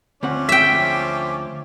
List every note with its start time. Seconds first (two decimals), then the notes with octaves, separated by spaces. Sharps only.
0.23 D2 F3 C4 C#4 F#5 D6
0.49 E5 G5 B6